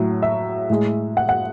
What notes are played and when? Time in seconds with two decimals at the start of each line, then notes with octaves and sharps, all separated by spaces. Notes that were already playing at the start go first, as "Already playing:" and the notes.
Already playing: A2 F#3
0.22 E5
0.70 A2 G#3
1.17 F#5
1.29 F#5